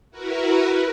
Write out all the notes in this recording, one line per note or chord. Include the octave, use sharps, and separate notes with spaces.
E4 F#4 A#4 B4